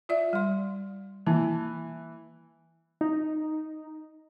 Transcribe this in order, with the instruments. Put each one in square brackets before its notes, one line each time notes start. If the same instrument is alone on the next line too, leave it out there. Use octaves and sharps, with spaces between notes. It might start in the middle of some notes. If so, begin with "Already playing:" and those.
[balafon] F4 D5 E5
G3 C6
[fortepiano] E3 [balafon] A#3
[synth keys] D#4